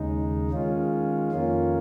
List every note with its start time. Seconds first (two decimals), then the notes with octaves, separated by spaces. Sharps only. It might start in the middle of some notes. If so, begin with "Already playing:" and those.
Already playing: D#2 C#3 G#3 D#4
0.51 D#3 G#3 C#4 F4
1.32 F2 D#3 A#3 C#4 F4